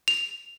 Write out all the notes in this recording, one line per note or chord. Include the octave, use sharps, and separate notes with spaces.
F7